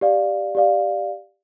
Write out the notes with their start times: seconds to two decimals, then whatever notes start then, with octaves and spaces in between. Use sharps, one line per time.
0.01 G4 D5 F5
0.55 G4 D5 F5